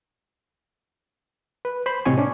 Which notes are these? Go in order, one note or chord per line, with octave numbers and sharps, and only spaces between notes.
B4
C5 B5
A2 C3 C4 C#5 D#5 G#5
C#4 D4